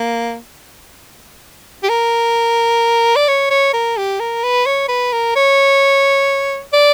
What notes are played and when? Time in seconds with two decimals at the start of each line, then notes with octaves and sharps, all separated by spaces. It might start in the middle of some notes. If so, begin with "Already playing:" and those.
Already playing: A#3
1.83 G4
1.89 A#4
3.16 D5
3.28 C#5
3.50 C#5
3.73 A#4
3.97 G4
4.19 A#4
4.43 B4
4.66 C#5
4.88 B4
5.12 A#4
5.36 C#5
6.73 D5